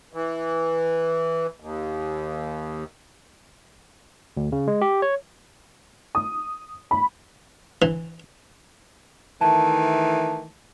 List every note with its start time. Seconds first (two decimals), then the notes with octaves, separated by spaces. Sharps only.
0.13 E3
1.60 D#2
4.37 D2
4.52 C#3
4.67 G#3
4.81 G4
5.02 C#5
6.15 D#6
6.91 B5
7.82 E3
9.41 D#3 E3 A3 A5